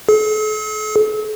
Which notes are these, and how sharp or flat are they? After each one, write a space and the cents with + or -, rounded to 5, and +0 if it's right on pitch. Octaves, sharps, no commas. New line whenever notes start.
A4 -45